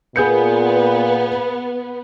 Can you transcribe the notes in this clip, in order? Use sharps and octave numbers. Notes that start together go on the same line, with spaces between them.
A#2 B3 G#4 G6 C#7